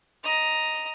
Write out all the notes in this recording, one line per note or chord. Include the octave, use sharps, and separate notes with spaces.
D#5 A#5